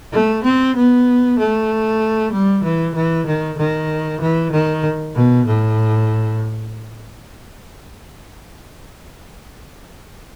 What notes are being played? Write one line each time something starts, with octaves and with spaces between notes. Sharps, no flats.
A3
C4
B3
A3
G3
E3
E3
D#3
D#3
E3
D#3
B2
A2